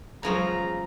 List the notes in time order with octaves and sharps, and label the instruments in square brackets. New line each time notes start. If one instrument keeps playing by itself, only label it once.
[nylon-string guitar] E2 F#3 G#3 [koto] C#3 F3 C#4 [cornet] A#5